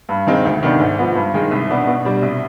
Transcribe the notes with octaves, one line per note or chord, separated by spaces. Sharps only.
G2
D#3 G#3 C4 D#4
D2
C3 D#3 B3 D4
G#2
F3 B3
G2
D#3 G#3
C2
B2 B3 D4
B2
G3 D4
C2